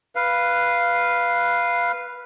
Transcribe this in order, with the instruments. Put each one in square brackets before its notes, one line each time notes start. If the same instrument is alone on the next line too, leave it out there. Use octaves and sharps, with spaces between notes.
[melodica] B4 F5